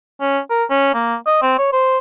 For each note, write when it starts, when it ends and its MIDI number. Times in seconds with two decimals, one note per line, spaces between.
0.21 0.39 61
0.50 0.64 70
0.70 0.93 61
0.94 1.15 58
1.26 1.42 75
1.42 1.54 60
1.58 1.69 73
1.73 1.98 72